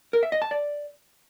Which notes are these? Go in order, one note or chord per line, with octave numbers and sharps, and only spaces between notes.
A#4
E5
D#5
A5
D5